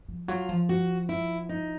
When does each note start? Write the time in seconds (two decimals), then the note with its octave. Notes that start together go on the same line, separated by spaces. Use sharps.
0.08 F3
0.28 F#3 F4
0.49 F3
0.69 F#4
1.09 E4
1.49 D#4